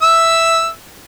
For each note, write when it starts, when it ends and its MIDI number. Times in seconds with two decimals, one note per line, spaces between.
0.02 0.68 76
0.02 0.68 88